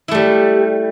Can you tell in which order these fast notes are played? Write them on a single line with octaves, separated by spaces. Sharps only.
E4 A3 G3